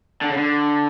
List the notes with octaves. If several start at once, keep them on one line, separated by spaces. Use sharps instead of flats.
D3
C#3
D3